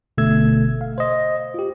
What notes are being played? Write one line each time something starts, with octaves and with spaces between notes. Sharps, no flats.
G1 B2 D3 A3 E6 G#6
F5
C5 D#5
F4 G4